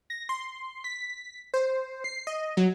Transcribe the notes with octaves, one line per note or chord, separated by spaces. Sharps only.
A#6
C6
B6
C5
C7
D#5
F#3